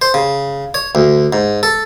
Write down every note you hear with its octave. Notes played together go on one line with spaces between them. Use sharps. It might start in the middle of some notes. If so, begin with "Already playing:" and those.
C5
C#3
C#5
D2
G#2
A4